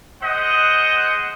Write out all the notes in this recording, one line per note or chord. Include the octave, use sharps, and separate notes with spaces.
G#4 C5 D#5 F#5